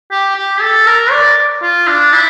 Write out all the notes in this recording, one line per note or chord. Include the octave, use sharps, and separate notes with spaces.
G4
G4
A4
A#4
D5
F4
D4
E4